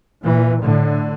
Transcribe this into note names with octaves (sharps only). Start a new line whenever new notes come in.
A#2 E3
A2 D3